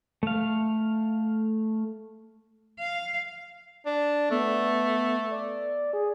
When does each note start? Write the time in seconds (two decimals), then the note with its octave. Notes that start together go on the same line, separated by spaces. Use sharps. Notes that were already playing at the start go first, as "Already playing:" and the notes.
0.23 A3 F5
2.79 F5
3.86 D4
4.31 A3 B3
5.31 D5
5.93 G#4